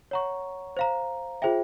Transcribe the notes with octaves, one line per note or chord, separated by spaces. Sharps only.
C#5 F#5 A#5 C#6
C5 F5 A#5
F4 G#4 C5 E5 G5